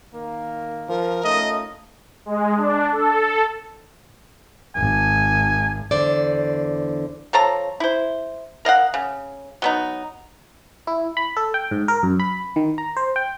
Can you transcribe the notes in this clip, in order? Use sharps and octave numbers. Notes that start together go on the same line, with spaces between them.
D#3 A#3
F3 A#4
A3 C#4 D#4 F4 D#5
G#3
D4
A4
G#1 G#5
E2 D3 C5 D5
F3 A4 C#5 A#5
E4 C5
A#4 D#5 F5 F#5
C#3
F#3 B3 D#4
E4
B5
A4
G5
G#2
A#4
F#2
B5
D#3
A#5
C5
G5